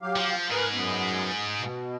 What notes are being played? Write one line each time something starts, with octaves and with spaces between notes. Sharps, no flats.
F#3 G4 F5
F3
G#2 G#4 A#4 B4
F#2 B3
B2